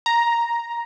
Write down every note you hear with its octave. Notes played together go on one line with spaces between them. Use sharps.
A#5